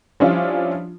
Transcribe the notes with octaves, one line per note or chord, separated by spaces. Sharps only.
F3 G3 C#4 D4 E4 F4